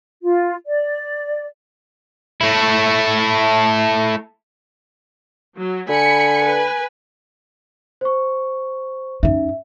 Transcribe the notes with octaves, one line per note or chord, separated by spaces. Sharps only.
F4
D5
A3 E4
F#3
D3 G#5 B5 C#7
B4
C5 C#6
F#2 D#4 E5